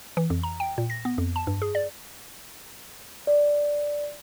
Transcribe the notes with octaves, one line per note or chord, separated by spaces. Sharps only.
E3
F2
A#5
G5
A#2
A#6
B3
F2
A5
G2
G#4
D5
D5